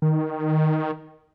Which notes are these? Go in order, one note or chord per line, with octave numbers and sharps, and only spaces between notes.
D#3